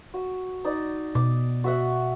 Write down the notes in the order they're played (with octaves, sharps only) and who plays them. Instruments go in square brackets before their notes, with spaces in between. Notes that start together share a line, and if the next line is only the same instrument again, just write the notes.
[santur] F#4
D#4 D5
[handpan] B2 [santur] D6
[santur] F#4 E5 F#5